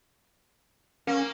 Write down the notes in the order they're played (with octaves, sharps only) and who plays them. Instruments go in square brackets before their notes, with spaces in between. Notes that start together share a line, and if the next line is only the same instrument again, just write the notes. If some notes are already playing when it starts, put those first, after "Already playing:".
[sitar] A#3 [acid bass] C#4